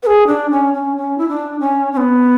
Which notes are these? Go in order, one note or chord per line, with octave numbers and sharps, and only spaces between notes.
B4
G#4
D4
C#4
C#4
C#4
E4
D4
C#4
C#4
B3